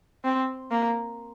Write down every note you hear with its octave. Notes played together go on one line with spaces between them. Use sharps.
C4
A#3